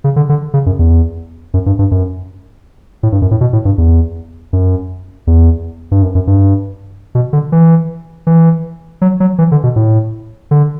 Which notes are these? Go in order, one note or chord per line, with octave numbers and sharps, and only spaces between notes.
C#3
D3
D3
C#3
F#2
E2
F#2
G2
G2
F#2
A2
G2
F#2
A2
B2
A2
G2
E2
F#2
E2
G2
F#2
F#2
G2
B2
D3
E3
E3
F#3
F#3
E3
D3
B2
A2
D3